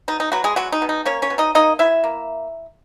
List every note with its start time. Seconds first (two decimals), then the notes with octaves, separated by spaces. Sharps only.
0.08 B2 D#4
0.20 D#4
0.32 F#3 B3 F#4
0.44 G#3 G#4
0.56 F#3 G#3 F#4
0.72 D#4
0.82 B2
0.89 D#4
1.05 A#3 C#4 C#5
1.22 C#4 C#5
1.30 B2
1.38 D#4 D#5
1.55 A#3 D#4 D#5
1.79 B2 E4 E5
2.04 A#3